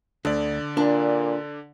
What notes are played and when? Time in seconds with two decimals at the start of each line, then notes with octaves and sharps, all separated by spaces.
0.25 D2 D3 D5
0.77 A#2 D4